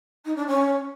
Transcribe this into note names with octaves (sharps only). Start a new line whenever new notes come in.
D#4
D4
C#4